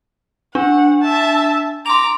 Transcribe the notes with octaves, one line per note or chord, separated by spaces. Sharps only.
D4 F#5
E5 A5
A#5 C6 D6 F7